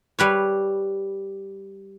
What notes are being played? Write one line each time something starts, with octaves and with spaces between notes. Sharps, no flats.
G3 B4 C#5